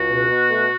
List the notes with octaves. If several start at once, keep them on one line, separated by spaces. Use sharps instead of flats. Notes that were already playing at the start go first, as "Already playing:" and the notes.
Already playing: C#2 F#4
B2
B2
A3